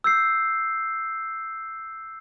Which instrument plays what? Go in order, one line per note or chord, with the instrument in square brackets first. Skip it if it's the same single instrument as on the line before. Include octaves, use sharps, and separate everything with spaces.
[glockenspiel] E6 G6 C7